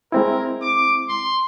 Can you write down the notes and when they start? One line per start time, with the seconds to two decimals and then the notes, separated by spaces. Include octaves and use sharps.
0.12 G#3 C4 E4 A#4
0.62 D6
1.09 C6